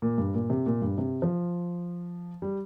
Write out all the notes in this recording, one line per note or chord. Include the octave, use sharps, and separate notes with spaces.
A#2
G2
A#2
C3
A#2
G2
C3
F3
G3